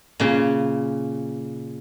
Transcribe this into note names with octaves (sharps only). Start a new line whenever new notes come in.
A#2 C#3